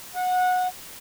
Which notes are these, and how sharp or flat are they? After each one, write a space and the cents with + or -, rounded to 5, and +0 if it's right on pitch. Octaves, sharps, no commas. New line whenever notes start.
F#5 -20